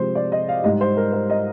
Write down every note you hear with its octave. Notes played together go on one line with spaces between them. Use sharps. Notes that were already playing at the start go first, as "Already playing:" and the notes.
Already playing: C3 F3 G#3 C5
D5
D#5
F5
G#2 G3 D#5
C5
A#4
C5
D#5